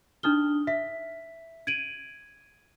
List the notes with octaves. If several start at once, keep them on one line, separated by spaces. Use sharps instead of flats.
D4 D#4 D#6 F6 G7
E5 B6
G#6 D7 D#7 F#7